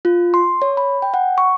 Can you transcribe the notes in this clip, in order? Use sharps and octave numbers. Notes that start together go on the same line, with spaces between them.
F4
C6
C#5
B5
G5
F#5
C#6